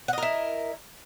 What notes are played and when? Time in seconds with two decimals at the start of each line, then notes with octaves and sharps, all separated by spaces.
0.08 F#5
0.13 D#5
0.18 A#4
0.22 E4